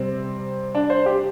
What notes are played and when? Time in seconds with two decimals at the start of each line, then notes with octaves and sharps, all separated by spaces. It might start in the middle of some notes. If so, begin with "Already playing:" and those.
Already playing: C3 G3 C4
0.75 D4
0.90 C5
1.06 G4